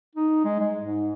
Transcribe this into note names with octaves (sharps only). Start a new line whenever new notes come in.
D#4
G#3
G#3
G#2